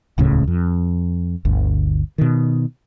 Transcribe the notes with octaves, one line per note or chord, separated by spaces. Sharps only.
D#1 C#2 A2 C#3
F2
G1 D2
B2 D#3